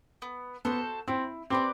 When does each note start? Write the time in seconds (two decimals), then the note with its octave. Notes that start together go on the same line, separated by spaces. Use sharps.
0.22 B3
0.65 B3 F#4 A4 C5
1.08 C4 E4
1.50 C4 G4 B4 D5